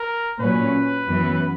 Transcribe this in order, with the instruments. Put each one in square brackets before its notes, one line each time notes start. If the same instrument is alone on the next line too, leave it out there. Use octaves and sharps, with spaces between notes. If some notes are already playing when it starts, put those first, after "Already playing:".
Already playing: [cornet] A#4
[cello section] A#2 F#3 C#4 [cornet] B4
[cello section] F#2 E3 B3